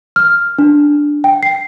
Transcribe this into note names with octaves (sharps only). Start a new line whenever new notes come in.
F6
D4
G5
C7